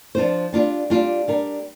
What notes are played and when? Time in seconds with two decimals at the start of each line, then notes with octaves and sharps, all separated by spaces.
0.15 F3 D4 F4 C5
0.52 G3 D4 F4
0.90 G3 D4 F4
1.28 G3 D4 A#4